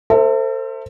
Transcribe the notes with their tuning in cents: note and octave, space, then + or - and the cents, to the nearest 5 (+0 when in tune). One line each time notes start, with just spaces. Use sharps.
A4 +40 C5 +0 E5 +0